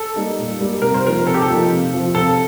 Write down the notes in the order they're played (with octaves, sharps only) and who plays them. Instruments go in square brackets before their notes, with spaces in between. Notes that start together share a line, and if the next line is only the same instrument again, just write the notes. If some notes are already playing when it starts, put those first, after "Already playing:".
Already playing: [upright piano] A4
[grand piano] G3 A#3 D#4
A#2
G3 A#3 D#4
[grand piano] C3 [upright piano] A#4
[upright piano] C5
[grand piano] F3 A#3 D#4 [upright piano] A#4
[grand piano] C3 [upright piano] A4
[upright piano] G4
A4
[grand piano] F3 A#3 D#4
C3
F3 C4 F4
[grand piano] C3 [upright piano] A4